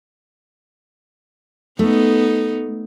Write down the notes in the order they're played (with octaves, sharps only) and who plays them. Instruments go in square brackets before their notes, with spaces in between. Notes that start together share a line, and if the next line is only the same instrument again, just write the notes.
[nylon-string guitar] A3 [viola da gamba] B3 D#4